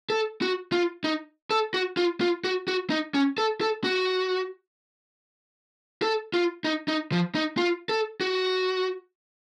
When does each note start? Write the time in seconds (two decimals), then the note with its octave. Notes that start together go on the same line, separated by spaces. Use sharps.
0.10 A4
0.42 F#4
0.72 F4
1.04 D#4
1.50 A4
1.74 F#4
1.97 F4
2.21 F4
2.44 F#4
2.68 F#4
2.90 D#4
3.14 C#4
3.38 A4
3.61 A4
3.84 F#4
6.02 A4
6.34 F4
6.64 D#4
6.88 D#4
7.12 F3
7.35 D#4
7.58 F4
7.89 A4
8.21 F#4